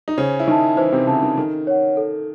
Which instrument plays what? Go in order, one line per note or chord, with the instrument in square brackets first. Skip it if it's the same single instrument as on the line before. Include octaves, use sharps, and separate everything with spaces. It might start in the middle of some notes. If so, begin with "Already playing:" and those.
[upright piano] D#4
[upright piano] C#3 C#4 [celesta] C5
[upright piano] E4
[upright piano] D#3 D#4 [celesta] E5 A5
[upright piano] E3 E4 [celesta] C5
[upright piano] C3 C4
[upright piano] C#3 [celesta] E5 A5
[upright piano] D#3
[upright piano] D#3 [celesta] A4
[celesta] C#5 F#5
A4